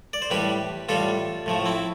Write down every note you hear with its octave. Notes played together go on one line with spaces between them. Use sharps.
D5
C5
A2 E3 G3 G4 B4
A2 E3 G3 F4 A4
A2 F3 A3
C4 E4